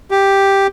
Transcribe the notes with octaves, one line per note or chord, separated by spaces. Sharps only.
G4